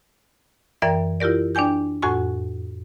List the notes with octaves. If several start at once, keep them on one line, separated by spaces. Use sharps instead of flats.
F#2 E3 A#4 D5 E5 G5
E4 F4 G4 A#4 D5
D4 D5 G5 G#5 G6
F2 A2 F#4 F#5 G#5 C#6